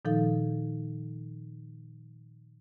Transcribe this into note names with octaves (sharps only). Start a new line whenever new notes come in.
A#2 D#3 F3 D#4 A4 F5